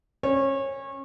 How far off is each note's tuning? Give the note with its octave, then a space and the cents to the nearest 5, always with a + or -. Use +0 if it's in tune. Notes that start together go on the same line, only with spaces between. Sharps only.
C#4 -25 C#5 -25